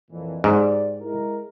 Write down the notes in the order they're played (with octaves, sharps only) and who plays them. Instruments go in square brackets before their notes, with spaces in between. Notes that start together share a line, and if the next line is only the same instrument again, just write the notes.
[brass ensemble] F2 A#2 E3
[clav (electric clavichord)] G#2 [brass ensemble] G4 D5
[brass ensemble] G#3 E4 A#4